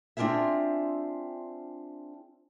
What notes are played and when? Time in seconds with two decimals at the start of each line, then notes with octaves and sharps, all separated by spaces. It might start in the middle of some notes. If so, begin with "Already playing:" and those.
0.17 C4 D4 F4 G#4 E5